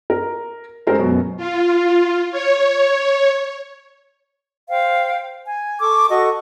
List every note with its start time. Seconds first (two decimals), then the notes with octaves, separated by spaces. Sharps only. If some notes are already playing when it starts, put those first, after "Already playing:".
0.10 A#4
0.87 G#3 C#4 G4 A4 A#4 C5
0.99 F#2 B2 B3 F#4
1.37 F4
2.31 C#5
4.69 C5 F5 G5
5.44 G#5
5.80 A4 C#6 D6 E6
6.09 F#4 A4 D#5 C#6